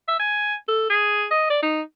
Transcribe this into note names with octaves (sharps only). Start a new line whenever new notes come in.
E5
G#5
A4
G#4
D#5
D5
D#4